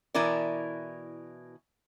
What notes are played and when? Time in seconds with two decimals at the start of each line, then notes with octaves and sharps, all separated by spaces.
0.14 B2 E3 E4 A#4 D5